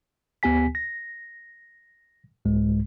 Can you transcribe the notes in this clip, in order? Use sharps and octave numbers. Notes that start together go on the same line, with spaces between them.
D2 B3 G4 G#5 B6
A#6
C2 G#2 G#3